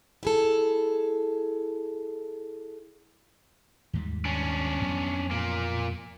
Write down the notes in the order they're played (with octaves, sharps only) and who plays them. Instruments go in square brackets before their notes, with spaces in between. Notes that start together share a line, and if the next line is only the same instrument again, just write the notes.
[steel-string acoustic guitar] E4 G#4 A4
[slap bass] D#2 G#2 G3
[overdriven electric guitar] C#4 D4
[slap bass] F2 F#3 B3
[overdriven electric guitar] A#2 A#3